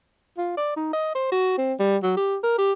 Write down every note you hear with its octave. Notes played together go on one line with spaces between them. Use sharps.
F4
D5
D#4
D#5
C5
F#4
C4
G3
F#3
G4
A#4
G4